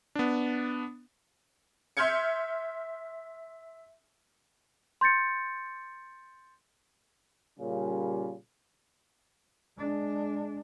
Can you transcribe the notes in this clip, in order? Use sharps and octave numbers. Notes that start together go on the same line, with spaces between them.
B3 D4
E5 C6 F6 G6 G#6 C#7
C6 G6 A6 C#7
A#2 C#3 G3
G#3 D4